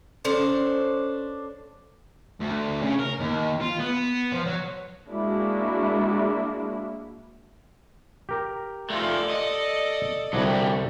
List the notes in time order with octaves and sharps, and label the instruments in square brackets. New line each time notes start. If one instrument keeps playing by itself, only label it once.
[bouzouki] C#4 D4 A4 C5
[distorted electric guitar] D2
C#3
A#4
D#2
F4
B3
F3
F#3
[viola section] G#3 A#3 D4 E4 F#4
[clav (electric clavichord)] G4 A#4
[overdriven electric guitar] A3 F4 [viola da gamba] A4 D5
[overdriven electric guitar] D#5
[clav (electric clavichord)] C2 D3 [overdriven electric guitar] F#3 G3